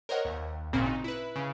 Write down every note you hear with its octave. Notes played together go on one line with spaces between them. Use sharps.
A#4 C5 C#5 D#5 F#5
D#2
G#1 A#2 C#3 C4 F#4 C5
D#4
E4 B4
C#3